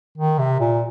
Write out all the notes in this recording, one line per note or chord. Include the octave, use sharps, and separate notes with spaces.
D#3
C3
A#2